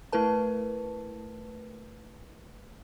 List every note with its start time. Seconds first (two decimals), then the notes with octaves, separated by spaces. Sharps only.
0.12 A3 E4 A#4 B4 A5